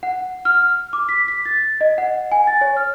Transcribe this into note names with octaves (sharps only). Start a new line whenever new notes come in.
F#5
F6
D6
B6
B6
A6
D#5
F#5
G#5
A6
C#5
F6